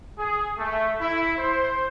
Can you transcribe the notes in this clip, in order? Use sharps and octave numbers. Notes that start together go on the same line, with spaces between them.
G#4
A3
E4
C5